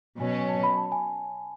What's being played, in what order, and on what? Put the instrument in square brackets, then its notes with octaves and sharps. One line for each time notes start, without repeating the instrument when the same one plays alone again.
[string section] B2 F#3 C#4 [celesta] G#5
[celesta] A5
B5
A5
G#5